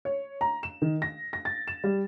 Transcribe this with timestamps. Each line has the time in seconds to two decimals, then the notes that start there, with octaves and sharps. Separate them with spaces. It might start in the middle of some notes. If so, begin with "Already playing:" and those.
0.05 C#5
0.41 A#5
0.63 E7
0.82 D#3
1.02 A#6
1.33 A#6
1.45 A6
1.68 E7
1.84 G3